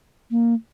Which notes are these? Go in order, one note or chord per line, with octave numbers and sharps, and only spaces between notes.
A#3